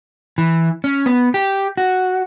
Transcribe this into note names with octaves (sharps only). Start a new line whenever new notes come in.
E3
C#4
B3
G4
F#4